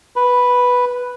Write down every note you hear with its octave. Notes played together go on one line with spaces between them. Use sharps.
B4